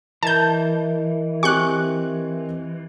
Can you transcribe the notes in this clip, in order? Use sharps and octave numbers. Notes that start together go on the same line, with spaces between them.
E3 A#4 D#5 E5 A5 G6
C4 G4 G#5 C#6 F#6